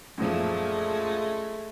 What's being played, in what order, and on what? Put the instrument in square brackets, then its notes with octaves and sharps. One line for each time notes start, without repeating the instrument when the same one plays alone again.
[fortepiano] F#2 A#2 F3 [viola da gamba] G#3 A3